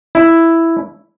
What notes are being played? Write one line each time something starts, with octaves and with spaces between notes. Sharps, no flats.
E4